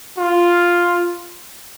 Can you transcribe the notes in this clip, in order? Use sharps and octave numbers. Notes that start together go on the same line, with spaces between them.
F4